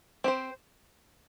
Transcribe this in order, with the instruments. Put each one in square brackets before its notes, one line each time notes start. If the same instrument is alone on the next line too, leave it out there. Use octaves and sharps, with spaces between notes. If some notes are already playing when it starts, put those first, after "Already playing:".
[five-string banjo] C4 G4 C5